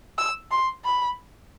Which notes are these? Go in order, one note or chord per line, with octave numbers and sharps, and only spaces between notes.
E6
C6
B5